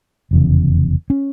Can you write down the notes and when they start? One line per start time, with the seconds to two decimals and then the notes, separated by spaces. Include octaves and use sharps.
0.31 F1 E2 C#3
1.10 C#4